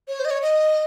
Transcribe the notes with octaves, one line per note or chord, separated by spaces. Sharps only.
C#5
C5
D#5
C#5
D#5